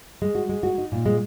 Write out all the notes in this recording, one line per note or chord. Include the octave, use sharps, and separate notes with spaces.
G#3
F#4
G#3
F#4
D#4
A#2
G#3